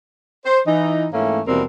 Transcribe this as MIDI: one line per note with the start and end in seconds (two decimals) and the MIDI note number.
0.45 0.61 72
0.67 1.07 52
0.67 1.07 63
1.13 1.40 44
1.13 1.40 52
1.13 1.40 57
1.13 1.40 58
1.13 1.40 61
1.47 1.62 39
1.47 1.62 47
1.47 1.62 52
1.47 1.62 55
1.47 1.62 60
1.47 1.62 70